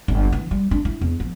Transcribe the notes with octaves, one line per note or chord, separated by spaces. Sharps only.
G1
E3
G3
D4
E4
E2
F3